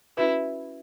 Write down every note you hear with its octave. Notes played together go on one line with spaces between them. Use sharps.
C#4 E4 F#4 B4